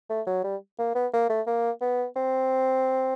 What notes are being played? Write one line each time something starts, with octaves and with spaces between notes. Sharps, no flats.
A3
F#3
G3
A#3
B3
A#3
A3
A#3
B3
C4